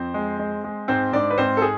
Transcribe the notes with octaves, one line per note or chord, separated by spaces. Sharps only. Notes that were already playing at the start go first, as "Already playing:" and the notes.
Already playing: F2 C4 C5
G#3
G#3
G#3
G#2 C4 C5
G#2 D4 D5
B4
G#2 C4 C5
A4
G#3 G#4